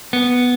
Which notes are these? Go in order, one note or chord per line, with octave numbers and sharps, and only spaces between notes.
B3